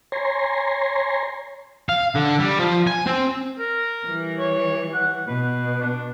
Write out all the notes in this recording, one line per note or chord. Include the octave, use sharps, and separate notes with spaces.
C#5 G#5 A#5 C6
F5
D3
G3
F3
G#5
C4
A#4
E3 G3
C#5
F#5
B2 B4
D4